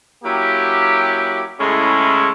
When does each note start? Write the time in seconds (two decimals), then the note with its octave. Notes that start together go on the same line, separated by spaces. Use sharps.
0.24 F#3 A#3 C#4 E4 G4
1.60 A2 C#3 G#3 C#4 E4 A4